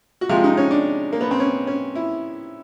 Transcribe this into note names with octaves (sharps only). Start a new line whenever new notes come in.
F#4
C3 F3 G#3 F4
D#4
C#4
D4
A#3
B3
C4
C#4
C#4
E4